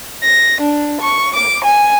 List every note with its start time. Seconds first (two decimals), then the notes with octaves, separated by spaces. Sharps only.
0.23 A#6
0.59 D4
1.01 C#6
1.35 D6
1.65 G#5